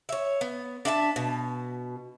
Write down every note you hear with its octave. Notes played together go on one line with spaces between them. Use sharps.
C#5 E5
B3
D4 E5 F#5 A5
B2